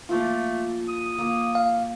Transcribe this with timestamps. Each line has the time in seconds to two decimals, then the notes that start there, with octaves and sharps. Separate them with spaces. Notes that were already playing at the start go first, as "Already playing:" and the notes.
0.09 F3 A3 A#3 F4
0.88 D#6
1.18 A#3
1.55 F5